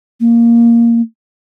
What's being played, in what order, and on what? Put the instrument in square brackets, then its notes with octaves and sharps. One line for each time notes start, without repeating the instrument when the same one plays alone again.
[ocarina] A#3